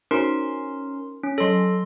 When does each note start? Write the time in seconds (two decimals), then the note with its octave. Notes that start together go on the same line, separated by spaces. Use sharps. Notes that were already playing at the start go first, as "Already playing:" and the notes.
0.11 C#4 D#4 F#4 A#4 C5 C6
1.23 C#4
1.38 F#3 A4 C#5 C6